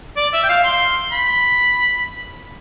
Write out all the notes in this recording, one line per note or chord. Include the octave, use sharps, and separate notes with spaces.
D5
E5
G5
F5
C6
B5